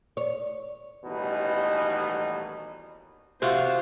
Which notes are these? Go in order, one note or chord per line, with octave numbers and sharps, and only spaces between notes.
C#5
A1 D#2 B2 E3 G3 D#4
C3 F4 F#4 C5 F5